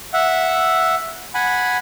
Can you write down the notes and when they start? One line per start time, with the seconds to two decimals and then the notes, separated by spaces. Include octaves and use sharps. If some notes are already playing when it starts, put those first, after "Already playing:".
0.13 E5 F#5
1.34 F#5 G#5 B5